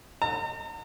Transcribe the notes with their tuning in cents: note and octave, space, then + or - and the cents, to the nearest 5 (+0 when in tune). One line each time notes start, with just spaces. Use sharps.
A#5 -45